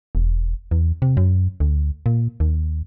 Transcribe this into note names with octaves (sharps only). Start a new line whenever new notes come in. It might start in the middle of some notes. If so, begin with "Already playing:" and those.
E1
E2
C3
F#2
D2
A#2
D#2